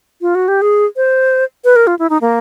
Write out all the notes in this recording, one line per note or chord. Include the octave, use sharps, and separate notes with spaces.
F4
F#4
G4
G#4
C5
B4
A#4
F4
E4
D#4
A#3